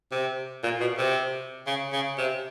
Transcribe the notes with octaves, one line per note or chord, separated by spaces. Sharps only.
C3
A#2
B2
C3
C#3
C#3
C3